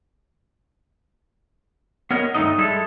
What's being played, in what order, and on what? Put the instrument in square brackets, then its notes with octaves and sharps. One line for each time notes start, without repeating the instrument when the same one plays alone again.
[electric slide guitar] B3 A#4 C#5 D#5
G2 D#3 G#3 A3 D#4 D#5
G3 G#3 E4 A4 A5